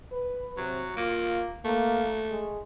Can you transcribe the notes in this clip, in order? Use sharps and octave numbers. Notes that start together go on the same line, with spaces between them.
B4
C3 F#3
A#3 F4
A3 A#3
G#3